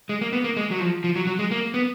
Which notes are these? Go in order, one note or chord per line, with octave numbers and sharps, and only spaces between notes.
G#3
A#3
B3
A#3
G#3
F#3
F3
F3
F#3
F#3
G#3
A#3
B3